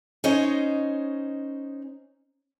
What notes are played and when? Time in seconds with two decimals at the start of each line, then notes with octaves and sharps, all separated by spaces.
0.24 C#4 D#4 C5 C#5 D#5